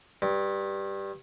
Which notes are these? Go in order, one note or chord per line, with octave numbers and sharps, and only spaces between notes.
G2